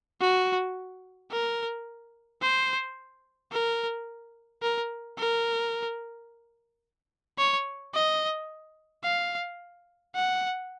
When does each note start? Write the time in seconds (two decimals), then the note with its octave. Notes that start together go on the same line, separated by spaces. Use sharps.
0.21 F#4
1.31 A#4
2.42 C5
3.52 A#4
4.63 A#4
5.18 A#4
7.38 C#5
7.94 D#5
9.04 F5
10.15 F#5